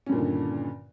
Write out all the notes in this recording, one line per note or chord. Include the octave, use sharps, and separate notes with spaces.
G2 A#2 D3 D#3 C#4